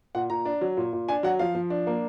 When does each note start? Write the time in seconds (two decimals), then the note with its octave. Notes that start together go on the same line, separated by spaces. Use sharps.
0.15 A#2 F#5
0.30 A#2 A#5
0.45 D4
0.61 F#3
0.77 A#2
0.93 A#2
1.08 D4 G#5
1.23 F#3 F#5
1.39 F3 F5
1.55 F3
1.70 D4
1.87 A#3